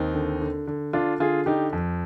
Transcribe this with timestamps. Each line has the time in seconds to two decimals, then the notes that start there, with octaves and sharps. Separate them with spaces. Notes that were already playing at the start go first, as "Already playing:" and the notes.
Already playing: D#2 C4 D#4
0.14 D3
0.41 D3
0.67 D3
0.93 D3 D4 F4
1.20 D3 F4 G#4
1.46 D3 D#4 G4
1.73 F2